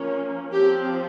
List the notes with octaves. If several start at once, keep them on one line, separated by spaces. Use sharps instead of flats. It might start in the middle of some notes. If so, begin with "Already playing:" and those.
Already playing: F3 A#3 C#4
F3 C4 G4